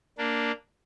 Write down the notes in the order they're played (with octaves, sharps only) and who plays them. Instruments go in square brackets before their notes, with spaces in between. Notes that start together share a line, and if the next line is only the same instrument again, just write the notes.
[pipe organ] A#3 D4